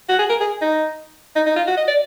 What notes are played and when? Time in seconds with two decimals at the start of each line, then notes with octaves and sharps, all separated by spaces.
0.09 F#4
0.19 G#4
0.30 A#4
0.40 G#4
0.61 D#4
1.36 D#4
1.46 D#4
1.56 F4
1.67 F#4
1.77 D#5
1.88 D5